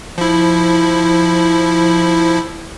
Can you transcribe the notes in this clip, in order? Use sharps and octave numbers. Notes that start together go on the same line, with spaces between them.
F3 E4